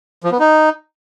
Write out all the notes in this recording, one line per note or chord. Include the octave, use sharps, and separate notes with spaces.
F3
B3
D#4